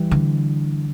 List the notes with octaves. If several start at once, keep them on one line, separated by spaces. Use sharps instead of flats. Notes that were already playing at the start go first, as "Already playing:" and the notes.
Already playing: E3 G3
D3